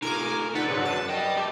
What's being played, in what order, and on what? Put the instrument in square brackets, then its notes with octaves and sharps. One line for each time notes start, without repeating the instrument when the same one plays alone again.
[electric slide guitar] D#4 F4 A4 [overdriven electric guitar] A#4 [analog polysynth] G#5 D6
[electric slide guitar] D#4 [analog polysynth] A4 B4 [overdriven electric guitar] D5 F#5
[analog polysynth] G#2 C#3 F#3 [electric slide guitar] B4
[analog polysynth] F#2 A5
[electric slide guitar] D5 G5 [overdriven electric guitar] D#5
[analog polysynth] A3 [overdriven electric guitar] G4